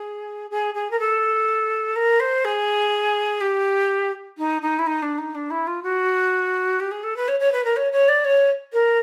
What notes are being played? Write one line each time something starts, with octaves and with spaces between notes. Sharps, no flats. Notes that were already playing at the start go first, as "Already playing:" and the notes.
Already playing: G#4
G#4
G#4
A#4
A4
A#4
C5
G#4
G4
D#4
D#4
E4
D#4
D4
D#4
D4
E4
F4
F#4
G4
G#4
A4
B4
C#5
C#5
B4
A#4
C#5
C#5
D5
C#5
A#4